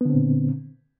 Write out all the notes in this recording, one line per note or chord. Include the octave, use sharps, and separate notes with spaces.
A#2 D3 B3 C4